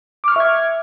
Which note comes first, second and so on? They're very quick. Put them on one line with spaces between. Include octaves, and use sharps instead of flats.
D6 F6 C#6 E5 G#6